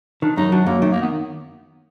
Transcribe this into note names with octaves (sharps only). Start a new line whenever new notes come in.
D#3 D4
F#2 D#4
F#3 D4
F#2 A#3
D#3 A3
A#3
B3